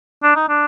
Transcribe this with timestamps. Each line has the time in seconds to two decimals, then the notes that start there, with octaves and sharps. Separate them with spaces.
0.23 D4
0.36 D#4
0.49 D4